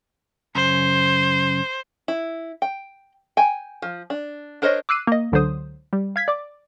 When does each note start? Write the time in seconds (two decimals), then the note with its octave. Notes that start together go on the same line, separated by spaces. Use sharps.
0.55 F#2 C#3 C5
2.08 E4
2.62 G5
3.37 G5 G#5
3.82 F3
4.10 D4
4.62 D4 A#4 C5 C#5 D#5
4.89 D6 E6 F#6 C7 D#7
5.07 A#3 D#5
5.32 C#2 D3 F#3 C5 D#6
5.93 G3
6.16 F5 G#6 B6
6.28 D5 D6